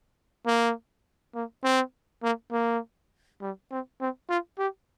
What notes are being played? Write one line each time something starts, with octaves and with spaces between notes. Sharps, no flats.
A#3
A#3
C4
A#3
A#3
G3
C4
C4
F4
G4